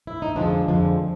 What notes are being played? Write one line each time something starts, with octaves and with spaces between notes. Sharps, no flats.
E4
D#4
F2 D3 F3 G#3 C4 D4
F2 D3 F3 G#3